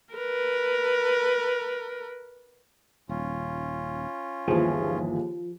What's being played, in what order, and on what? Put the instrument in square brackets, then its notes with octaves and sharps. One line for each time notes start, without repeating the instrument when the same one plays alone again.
[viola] A#4 B4
[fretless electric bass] D#1 [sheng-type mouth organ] C#4 F4
[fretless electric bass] G1 E3 [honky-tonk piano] D#2 G#4 [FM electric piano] F3